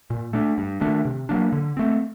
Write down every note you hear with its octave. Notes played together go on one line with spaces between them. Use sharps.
A#2
A3 D4
G2
D#3 A3 D4
C3
F#3 A#3 D4
D3
A3 C4